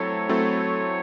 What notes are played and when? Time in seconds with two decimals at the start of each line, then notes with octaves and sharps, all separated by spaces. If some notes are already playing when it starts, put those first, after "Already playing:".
Already playing: F#3 A3 C4 E4 A4 C#5
0.29 F#3 A3 C4 E4 A4